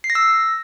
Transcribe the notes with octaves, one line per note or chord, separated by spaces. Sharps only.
C7
A#6
E6